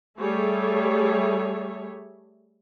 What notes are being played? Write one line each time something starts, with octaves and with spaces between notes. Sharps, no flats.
G3 A3 G#4 A4 C#5 E5